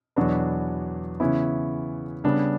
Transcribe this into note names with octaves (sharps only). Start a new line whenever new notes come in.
E2 B2 F#3 B3 D4 F#4
C#3 E3 B3 C#4 E4
C#3 G3 B3 D4